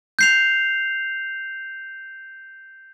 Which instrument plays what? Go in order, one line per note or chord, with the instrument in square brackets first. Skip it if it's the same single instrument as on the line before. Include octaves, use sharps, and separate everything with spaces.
[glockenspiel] G6 C7 F7